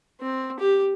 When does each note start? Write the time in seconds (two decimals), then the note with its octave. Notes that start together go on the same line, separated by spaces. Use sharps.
0.21 C4
0.60 G4